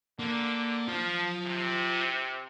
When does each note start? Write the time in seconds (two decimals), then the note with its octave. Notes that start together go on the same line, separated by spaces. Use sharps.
0.19 D3 A#3
0.88 F3 F4 A5
1.46 C3